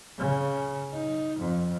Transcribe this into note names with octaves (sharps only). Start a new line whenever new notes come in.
C#3
D#4
F2